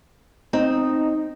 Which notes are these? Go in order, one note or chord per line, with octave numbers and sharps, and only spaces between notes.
C4 D#4